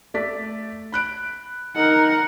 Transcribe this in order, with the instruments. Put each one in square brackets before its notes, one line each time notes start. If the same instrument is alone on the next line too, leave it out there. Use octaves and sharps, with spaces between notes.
[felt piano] A3 D5 B6
B5 F#6 D7
[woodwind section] D#4 [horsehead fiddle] A#4 F#5